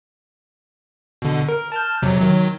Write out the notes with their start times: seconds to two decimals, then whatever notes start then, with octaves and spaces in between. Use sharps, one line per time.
1.22 B2 D3
1.49 A#4
1.72 A5 F6 G6
2.02 F2 C3 F#3
2.21 D#3 F#3